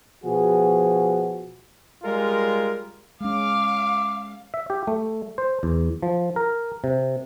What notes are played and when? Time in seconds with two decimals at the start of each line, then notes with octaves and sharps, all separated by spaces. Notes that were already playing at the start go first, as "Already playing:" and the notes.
0.25 B2 F3 F#4 G#4
2.02 G3 G#3 F4 A#4
3.21 G#3 C#4 F5 D6
4.54 E5
4.70 G4
4.87 A3
5.38 C5
5.63 E2
6.03 F3
6.36 A#4
6.84 C3